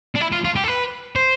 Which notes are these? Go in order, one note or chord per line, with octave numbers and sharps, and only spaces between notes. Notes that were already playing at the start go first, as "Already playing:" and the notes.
D4
E4
F4
F4
G4
A4
B4
C5